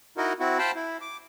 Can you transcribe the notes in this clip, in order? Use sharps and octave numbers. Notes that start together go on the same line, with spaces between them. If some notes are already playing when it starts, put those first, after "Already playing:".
D#4 E4 F#4 A#4 D#5
C4 E4 F#4
C5 F5 G5 A5 B5
E4
D6